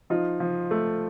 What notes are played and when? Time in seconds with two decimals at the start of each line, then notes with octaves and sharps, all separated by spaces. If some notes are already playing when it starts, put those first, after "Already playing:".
0.10 F3 D#4 F4
0.40 F3
0.71 A3